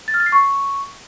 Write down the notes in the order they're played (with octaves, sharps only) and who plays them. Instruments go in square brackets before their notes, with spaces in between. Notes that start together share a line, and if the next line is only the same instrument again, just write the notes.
[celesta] A6
F6
A6
C7
C#6